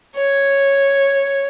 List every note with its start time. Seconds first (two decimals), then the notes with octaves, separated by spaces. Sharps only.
0.17 C#5